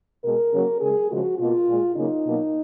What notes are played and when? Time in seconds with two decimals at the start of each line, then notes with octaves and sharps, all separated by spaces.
0.23 B2 G#3 A#4
0.51 C#3 F#3 A#3
0.80 C#3 G#3 G#4
1.09 C#3 F3 G#3 F#4
1.38 B2 A#3 F4
1.67 A#2 G#3
1.95 C#3 F#3 A#3 D#4
2.24 B2 F#3 A#3